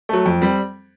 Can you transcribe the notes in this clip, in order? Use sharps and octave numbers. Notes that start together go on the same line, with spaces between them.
F#3 A3
F2
G3 C4